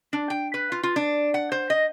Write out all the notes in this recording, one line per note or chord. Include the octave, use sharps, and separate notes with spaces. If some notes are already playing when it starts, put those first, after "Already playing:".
D4
G5
B4
F4
F4
D4
F#5
C5
D#5